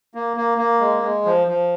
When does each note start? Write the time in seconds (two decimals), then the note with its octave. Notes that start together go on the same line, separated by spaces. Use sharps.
0.14 A#3
0.37 A#3
0.58 A#3
0.80 G#3
1.02 G#3
1.25 F3
1.47 F3